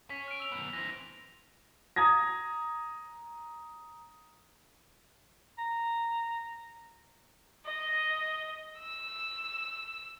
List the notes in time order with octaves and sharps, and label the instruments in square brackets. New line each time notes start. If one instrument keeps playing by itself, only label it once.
[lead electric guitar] C#4 [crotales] B6
[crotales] F6 D7
E6 F7
[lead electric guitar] F#2 B3
[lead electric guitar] E3 C4 [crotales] A#6
[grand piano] A#5 D#6 G#6 A#6
[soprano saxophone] A#5
[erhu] D#5
E6